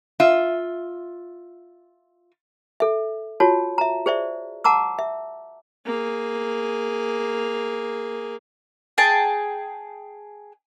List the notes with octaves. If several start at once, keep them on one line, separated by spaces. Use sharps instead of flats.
F4 E5
A4 E5
F4 F#4 C#5 A5
E5 A#5
G#4 C5 D5 E5
F#5 A5 A#5 D6 E6
E5
A#3 G#4
G#4 G5 A5